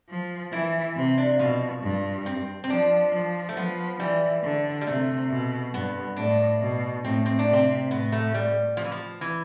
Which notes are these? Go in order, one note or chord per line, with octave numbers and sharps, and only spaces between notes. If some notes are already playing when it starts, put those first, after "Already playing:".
F3
E3 E4
C3
D4
B2 F3
G2
C4
C4
F3 D4
F3
A3
F3 B3
E3 G3
D3
G3
C3 A3
B2
G2 B3
A2 D4
B2
A2 C4
C4
D4
C3
C4
A2 B3
A3
G3
F3
E3
F3
E3